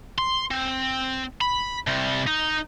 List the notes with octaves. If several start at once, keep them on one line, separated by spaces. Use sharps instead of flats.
C6
C4
B5
C3 G3
D#4